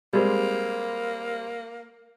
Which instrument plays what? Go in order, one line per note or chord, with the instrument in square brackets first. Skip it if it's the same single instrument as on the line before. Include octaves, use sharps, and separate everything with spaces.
[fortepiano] G3 G#3 C4 [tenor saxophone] A#3